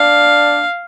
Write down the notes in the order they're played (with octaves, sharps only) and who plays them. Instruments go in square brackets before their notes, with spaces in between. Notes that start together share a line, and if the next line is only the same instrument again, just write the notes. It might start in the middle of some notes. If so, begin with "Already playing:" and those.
Already playing: [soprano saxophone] D4 [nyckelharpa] F5